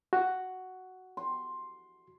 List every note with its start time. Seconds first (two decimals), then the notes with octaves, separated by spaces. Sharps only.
0.13 F#4
1.17 C6